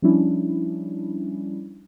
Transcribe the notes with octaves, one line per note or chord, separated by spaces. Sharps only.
F3 G3 C#4 D4 E4